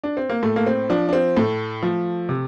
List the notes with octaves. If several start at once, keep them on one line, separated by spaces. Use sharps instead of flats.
D4
C4
A#3
A2 A3
A#3
C4
F3 D4
D4
C4
A2 A3
F3
C3